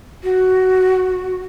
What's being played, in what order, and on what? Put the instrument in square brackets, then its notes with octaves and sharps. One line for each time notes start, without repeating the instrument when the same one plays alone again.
[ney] F#4